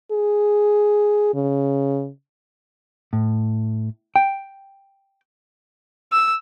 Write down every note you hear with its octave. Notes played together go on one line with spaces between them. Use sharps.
G#4
C#3
A2
G5
E6